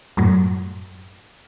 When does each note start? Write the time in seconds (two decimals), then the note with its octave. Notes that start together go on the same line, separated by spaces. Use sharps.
0.17 F#2 A2 F#3